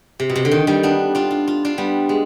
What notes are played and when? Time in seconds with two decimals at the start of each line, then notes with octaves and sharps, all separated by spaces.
0.20 C3
0.29 B2
0.36 C3
0.45 D3
0.51 D#3
0.67 D#3 G3
0.83 B3 D4
1.15 D4 F4
1.31 F4
1.48 F4
1.65 D4 F4
1.78 G3 B3
2.09 G#3